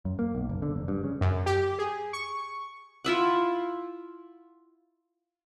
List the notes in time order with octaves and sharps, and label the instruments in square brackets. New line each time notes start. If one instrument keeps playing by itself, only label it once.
[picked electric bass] F#2
A#3
B1
F#1
D3
F1
G2
C#3
[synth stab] F#2
G4
G#4
C#6
[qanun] E4 F4 E5 F#5